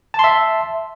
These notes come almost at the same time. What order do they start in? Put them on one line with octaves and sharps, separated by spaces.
A5 C6 E5